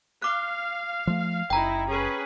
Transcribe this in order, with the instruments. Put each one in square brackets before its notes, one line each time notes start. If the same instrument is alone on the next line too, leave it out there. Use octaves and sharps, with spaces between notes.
[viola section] F5 [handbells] D6 F#6
[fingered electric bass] F3 A3
[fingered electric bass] F#1 [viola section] D#4 E4 [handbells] G5 A#5
[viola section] C#4 G#4 B4